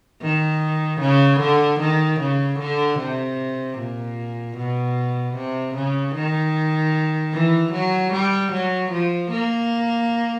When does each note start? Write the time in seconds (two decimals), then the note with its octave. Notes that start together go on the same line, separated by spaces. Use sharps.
0.22 D#3
1.01 C#3
1.40 D3
1.80 D#3
2.20 C#3
2.59 D3
2.99 C3
3.78 A#2
4.57 B2
5.35 C3
5.75 C#3
6.15 D#3
7.33 E3
7.72 F#3
8.13 G3
8.52 F#3
8.91 F3
9.31 A#3